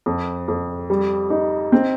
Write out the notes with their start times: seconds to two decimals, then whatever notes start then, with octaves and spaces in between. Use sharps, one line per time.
0.06 F2
0.48 F2
0.90 G3
1.30 D#4
1.72 C4